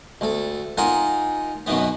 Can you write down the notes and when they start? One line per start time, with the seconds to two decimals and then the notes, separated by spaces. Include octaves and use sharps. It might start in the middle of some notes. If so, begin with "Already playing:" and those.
0.21 D2 A4
0.78 D#4 F4 A#4 F#5 G#5
1.66 F#2 B2 D#3 B3